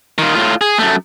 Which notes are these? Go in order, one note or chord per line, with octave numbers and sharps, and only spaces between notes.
D#3 F4
A2 F4
G#4
F#2 A3